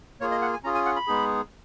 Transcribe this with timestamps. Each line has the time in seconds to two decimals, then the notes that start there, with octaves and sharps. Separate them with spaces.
0.21 A#3 F4 G#4 C#5
0.31 D#5
0.42 F#5
0.53 G#5
0.63 C#4 F4 G#4 A#5
0.75 G#5
0.85 F#5
0.96 B5
1.07 G#3 B3 D#4 G#4